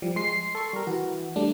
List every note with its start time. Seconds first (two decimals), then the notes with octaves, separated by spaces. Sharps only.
0.02 F3 G3
0.16 G#3 C6 C7
0.55 A4 C#6
0.73 G3 A#4
0.87 E3 F#4
1.36 G3 A3 D4